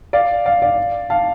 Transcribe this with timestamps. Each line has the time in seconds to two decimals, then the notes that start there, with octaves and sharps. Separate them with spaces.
0.13 D5 F5
0.46 D5 F5
0.62 D5 F5
1.10 F5 A5